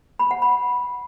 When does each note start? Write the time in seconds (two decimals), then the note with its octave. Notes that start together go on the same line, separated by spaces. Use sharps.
0.19 B5
0.31 F#5
0.42 B5